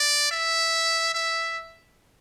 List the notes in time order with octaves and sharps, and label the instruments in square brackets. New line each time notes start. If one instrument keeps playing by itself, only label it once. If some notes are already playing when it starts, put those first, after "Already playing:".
Already playing: [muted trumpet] D5
E5
E5